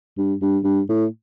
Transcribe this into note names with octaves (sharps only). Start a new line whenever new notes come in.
G2
G2
G2
A2